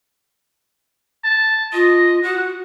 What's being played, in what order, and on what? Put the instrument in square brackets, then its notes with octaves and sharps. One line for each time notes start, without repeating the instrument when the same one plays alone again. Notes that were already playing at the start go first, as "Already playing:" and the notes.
[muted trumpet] A5
[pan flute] F4 [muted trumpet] D#5
[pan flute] F#4 [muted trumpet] F#5